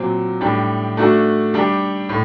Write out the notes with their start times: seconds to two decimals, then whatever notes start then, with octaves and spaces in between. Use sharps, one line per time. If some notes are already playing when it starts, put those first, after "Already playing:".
Already playing: A#2 F#3 C4
0.41 A2 G3 D4 G4
0.97 A3 D4 F#4
1.54 G3 D4 G4
2.09 A2